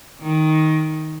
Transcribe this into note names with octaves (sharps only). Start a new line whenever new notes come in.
D#3